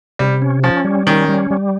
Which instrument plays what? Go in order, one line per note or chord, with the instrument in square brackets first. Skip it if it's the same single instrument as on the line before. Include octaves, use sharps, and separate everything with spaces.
[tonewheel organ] C3 [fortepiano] G3
[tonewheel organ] C#4
[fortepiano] F3 [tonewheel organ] C#4
[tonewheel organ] G3
[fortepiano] D#3 [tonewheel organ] C#4
[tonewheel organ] G3
G3